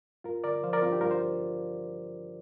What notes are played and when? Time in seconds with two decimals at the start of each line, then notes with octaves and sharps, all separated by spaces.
0.24 G2 F4 A#4
0.44 D3 A#4 D5
0.63 F3 C5 F5
0.73 A#4 D5
0.82 G2 C4 F4
0.91 D4 G4
1.01 G2 F4 A#4
1.10 C5 F5